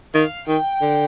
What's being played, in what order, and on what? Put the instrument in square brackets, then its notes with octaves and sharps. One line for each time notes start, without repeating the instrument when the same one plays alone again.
[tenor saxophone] D#3 [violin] F5
[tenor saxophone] D#3 [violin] G5
[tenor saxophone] D3